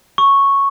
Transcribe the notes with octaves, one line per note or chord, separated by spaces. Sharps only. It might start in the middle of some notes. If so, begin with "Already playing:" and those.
C#6